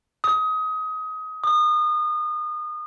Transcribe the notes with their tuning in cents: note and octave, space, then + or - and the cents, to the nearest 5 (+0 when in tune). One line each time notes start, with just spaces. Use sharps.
D#6 +25
D#6 -30